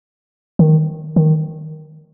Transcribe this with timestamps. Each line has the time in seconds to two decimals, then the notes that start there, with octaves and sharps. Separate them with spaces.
0.59 D#3
1.16 D#3